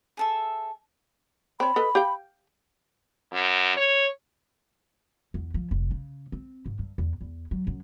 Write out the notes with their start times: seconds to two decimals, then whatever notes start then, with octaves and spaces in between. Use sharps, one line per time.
0.17 G#4 A4 E5
1.60 C4 C#5 B5
1.76 A4 B4 D#5
1.95 G4 F5 G5
3.32 F#2
3.77 C#5
5.34 E2
5.54 F3
5.71 F1
5.91 C#3
6.32 C4
6.66 G#2
6.79 G2
6.98 E2
7.21 E2
7.51 F#3
7.67 F#2